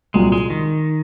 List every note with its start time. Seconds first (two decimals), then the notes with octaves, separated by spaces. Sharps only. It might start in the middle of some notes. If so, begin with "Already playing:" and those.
0.14 C2 A#2 F#3 G#3
0.32 G#3
0.50 D#3